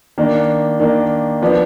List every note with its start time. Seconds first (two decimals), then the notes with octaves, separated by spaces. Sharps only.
0.18 D#3 A#3 D4
0.80 D#3 A#3 D4
1.42 F3 B3 D4